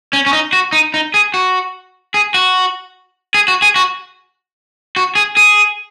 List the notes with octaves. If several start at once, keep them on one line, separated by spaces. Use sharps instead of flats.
C#4
C#4
D#4
F#4
D#4
D#4
G#4
F#4
G#4
F#4
G#4
F#4
G#4
F#4
F#4
G#4
G#4